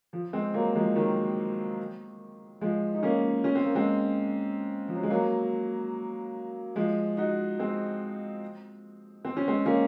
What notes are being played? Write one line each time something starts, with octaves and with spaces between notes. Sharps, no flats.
F3
G#3 C4
F#3 A#3
F3 G#3
D#3 F#3
F3 G#3
D#4
A#3 C#4
C#4
C4
A#3
G#3 C4
F3
F#3
G#3
F#3 A#3
F3 G#3
D#4 F#4
G#3 C4
C4
C#4
G#3 C4
A#3 C#4